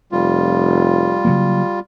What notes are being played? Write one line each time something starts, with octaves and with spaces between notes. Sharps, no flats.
F1 G3 F4
C#3 F#3 A#3